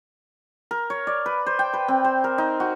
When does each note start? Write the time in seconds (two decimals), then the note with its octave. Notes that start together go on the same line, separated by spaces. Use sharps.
0.71 A#4
0.90 C#5
1.07 D5
1.26 B4
1.46 C5
1.59 G5
1.73 B4
1.88 C4
2.04 C5
2.24 A#4
2.38 D#4
2.60 F#4